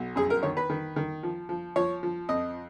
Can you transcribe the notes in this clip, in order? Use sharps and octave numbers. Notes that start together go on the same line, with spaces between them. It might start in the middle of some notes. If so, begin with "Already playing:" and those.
Already playing: B1
F#2 G#4
A#4
D#3 C#5
B4
D#3
D#3
F3
F3
F3 C#5
F3
F2 D#5